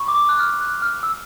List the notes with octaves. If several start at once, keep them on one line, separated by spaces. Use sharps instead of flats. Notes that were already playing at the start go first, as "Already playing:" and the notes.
Already playing: B5 C#6
D6
F#6
F6
F#6
F6
E6